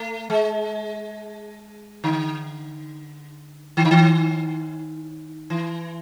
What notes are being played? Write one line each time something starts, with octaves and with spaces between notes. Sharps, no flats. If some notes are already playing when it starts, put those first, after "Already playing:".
Already playing: A3
G#3
D3
D#3
D3
D#3
E3